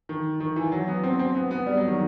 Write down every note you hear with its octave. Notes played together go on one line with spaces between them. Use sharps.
D#3
D#3
E3
F#3
B3
C4
C4
B3
B3
G3
F#3
D#3